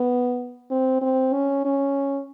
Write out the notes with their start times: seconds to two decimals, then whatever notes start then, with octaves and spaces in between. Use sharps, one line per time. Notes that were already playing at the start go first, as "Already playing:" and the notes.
Already playing: B3
0.71 C4
1.02 C4
1.33 C#4
1.65 C#4